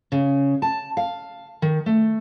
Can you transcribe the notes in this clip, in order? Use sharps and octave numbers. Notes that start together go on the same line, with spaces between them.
C#3
A5
F5
D#3
A3